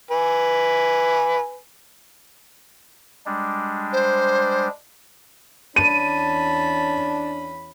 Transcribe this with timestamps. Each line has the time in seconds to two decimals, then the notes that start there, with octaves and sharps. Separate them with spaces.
0.11 B4 G#5
3.26 G3 G#3 D4
3.93 C5
5.76 E2 C#4 D4 A5 B5 D#7